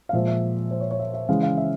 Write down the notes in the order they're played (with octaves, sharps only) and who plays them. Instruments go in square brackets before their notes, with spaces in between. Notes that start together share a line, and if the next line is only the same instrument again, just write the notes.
[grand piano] F5
A#2 F3 G#3 E5
E5
C5
C#5
C#5
E5
E5
C#3 E3 G#3 F5
F5
E5